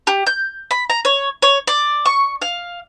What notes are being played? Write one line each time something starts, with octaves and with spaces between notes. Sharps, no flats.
G4
G6
B5
A#5
C#5
C#5
D5
C#6
F5